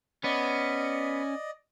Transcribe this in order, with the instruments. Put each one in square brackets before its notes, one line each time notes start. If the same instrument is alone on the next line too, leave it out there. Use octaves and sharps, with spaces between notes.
[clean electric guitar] B3 [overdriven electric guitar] C#4 [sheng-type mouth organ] D5 D#5